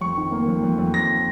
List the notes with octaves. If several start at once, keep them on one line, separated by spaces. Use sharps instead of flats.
F2 C#6
D#3
A#3
F2
F2
F2
F2 A#6